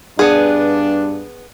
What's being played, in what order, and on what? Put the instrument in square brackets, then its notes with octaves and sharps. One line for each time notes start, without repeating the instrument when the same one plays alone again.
[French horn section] G2 D4 [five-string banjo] B3 G#4